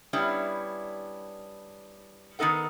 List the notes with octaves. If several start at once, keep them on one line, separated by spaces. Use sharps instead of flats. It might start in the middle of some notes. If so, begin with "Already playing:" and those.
G3 B3 C#4 D4 E4
D#3 B3 D#4 A4 F#5